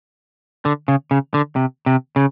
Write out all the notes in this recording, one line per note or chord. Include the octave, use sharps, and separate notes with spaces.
D3
C#3
C#3
D3
C3
C3
C#3